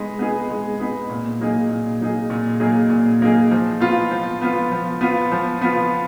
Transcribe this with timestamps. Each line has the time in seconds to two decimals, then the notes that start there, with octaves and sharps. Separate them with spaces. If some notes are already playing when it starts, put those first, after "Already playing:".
Already playing: G#3 B3 D#4
0.19 B3 D#4 G#4
0.50 G#3
0.80 B3 D#4 G#4
1.10 A#2
1.40 F#3 A#3 D#4 G#4
1.70 A#2
2.00 F#3 A#3 D#4 G#4
2.30 A#2
2.60 F#3 A#3 D#4 G#4
2.90 A#2
3.21 F#3 A#3 D#4 G#4
3.51 F3
3.80 B3 F4
4.11 F3
4.42 B3 F4
4.71 F3
5.01 B3 F4
5.32 F3
5.61 B3 F4